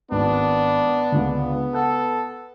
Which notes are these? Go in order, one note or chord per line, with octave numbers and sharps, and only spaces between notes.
G#1 B3 D4
C#2 D3
A4 F#5